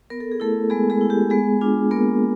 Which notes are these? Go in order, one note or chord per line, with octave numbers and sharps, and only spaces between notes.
B3 A#4
A4
G#4
A3 E4 A4
G#3 B3 G#4
G#3 G#4
E4
G4
G#3 B3 G#4
D4 F4
A#3 B3 A#4